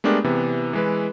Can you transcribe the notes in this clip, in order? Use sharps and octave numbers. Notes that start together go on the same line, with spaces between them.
G#3 A3 B3 D4 G4 A#4
C3 E3 B3
E3 G#3 B4